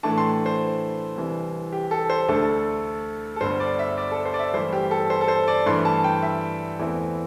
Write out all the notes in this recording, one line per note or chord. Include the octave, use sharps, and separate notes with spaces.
A2 E3 A3 D4 A5
C6
C5
C2 C3 E3
G4
A4
C5
D2 D3 A3 D4 A4
A4
G1 G2 D3 C5
D5
E5
D5
A4
C5
D5
E5
G1 G2 E3 A3 E4 C5
G4
A4
C5
A4
C5
D5
G2 E3 A3 D4 C6
A5
G5
E5
E2 E3 A3 C4 E4